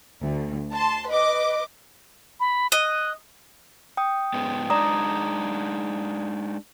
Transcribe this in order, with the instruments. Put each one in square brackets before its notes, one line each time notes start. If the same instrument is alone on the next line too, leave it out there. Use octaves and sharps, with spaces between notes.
[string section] D2
A5 C6
B4 D#5 D6
[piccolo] B5
[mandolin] D#5 [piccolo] F#6
[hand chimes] G5 D#6
[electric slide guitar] G#2 G#3 B3
[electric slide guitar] G#3 D4 D#4 [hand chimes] D5 A#5 D#6